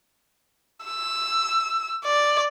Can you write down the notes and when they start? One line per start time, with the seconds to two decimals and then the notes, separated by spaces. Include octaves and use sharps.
0.85 E6
2.05 D5